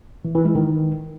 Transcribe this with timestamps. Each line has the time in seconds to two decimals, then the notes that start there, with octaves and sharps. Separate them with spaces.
0.25 E3
0.35 E3
0.45 G#3
0.55 D#3